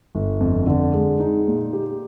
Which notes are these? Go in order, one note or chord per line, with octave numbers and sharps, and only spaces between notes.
G1
F2
D3
G#3
D#4
A#2
G4